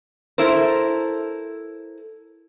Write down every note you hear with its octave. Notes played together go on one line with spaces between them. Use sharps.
E4 A4 A#4 C5